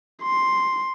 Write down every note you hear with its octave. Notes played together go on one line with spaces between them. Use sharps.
C6